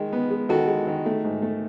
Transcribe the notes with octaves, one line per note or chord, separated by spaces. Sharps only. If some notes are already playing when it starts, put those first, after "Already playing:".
Already playing: D#3 G#3
B3
G#3
D#3 F#4 A4
G#3
D#3
A3
G#2
A3